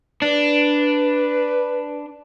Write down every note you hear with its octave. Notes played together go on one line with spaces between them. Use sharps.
D4 B4